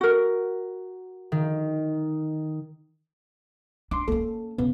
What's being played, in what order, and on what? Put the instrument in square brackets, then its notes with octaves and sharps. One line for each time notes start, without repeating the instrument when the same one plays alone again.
[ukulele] F#4 A#4
[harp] D#3
[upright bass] D4 [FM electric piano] C6 D6
[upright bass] A#3 C#4 [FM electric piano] A4
[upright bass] C#3 [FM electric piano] B3